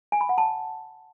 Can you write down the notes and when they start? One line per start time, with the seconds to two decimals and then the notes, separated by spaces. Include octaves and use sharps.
0.12 G#5
0.21 B5
0.29 F#5
0.38 A5